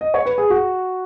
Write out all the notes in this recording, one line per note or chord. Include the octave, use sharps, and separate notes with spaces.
D#5
C#5
B4
G#4
F#4